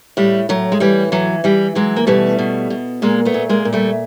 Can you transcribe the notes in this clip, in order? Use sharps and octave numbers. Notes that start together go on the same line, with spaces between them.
A2 G3
A2 F#3
G#3
E3 G3
E3 F#3
E3 G3
E3 F#3 G#3
A#3
B2 G3 A3
B2
B2
A#2 G#3 A#3
A3 B3
A#2
G#3 A#3
A#2
G3 A3